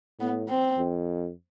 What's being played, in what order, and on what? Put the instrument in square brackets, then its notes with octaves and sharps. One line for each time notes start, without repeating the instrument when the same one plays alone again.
[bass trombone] A2 [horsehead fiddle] B3
[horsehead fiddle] C4
[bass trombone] F2